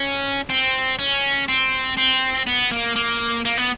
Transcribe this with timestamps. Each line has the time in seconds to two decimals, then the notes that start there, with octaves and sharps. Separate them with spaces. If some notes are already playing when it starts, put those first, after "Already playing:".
Already playing: C#4
0.50 C4
0.99 C#4
1.48 C4
1.97 C4
2.47 B3
2.71 A#3
2.96 A#3
3.45 A#3
3.57 B3